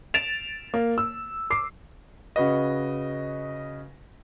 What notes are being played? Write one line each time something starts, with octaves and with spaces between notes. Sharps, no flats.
A6 D7 E7 F7
A#3
E6
D6 C7
C#3 F#4 B4 D#5